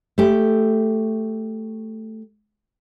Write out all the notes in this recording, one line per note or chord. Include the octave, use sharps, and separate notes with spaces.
A3 G4